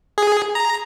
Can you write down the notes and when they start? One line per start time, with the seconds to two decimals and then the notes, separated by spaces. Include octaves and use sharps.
0.18 G#4
0.55 A#5